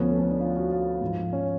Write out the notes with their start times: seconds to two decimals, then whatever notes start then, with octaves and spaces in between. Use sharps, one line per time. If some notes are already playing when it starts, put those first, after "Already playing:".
Already playing: D2 D3 F3 B3 C#4
0.09 A3
0.19 C#4
0.29 D4
0.40 F4
0.56 F#4
0.71 F4
1.01 G#2 F3
1.33 C#4